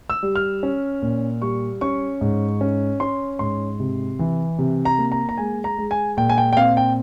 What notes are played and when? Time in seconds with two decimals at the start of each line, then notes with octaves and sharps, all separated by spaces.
0.10 E6
0.23 G3
0.36 F6
0.63 C#4
1.02 A#2
1.42 G3 C#6
1.81 C#4 C#6
2.21 G#2
2.61 C#4
3.00 C#4 C6
3.39 G#2 C6
3.80 C3
4.19 E3
4.59 C3
4.85 A#5
4.98 A#3
5.12 A#5
5.29 A#5
5.38 G#3 G#5
5.64 A#5
5.78 G#3
5.91 G#5
6.17 A#2 G5
6.29 G#5
6.38 G5
6.53 G5
6.57 C4 F5
6.77 G5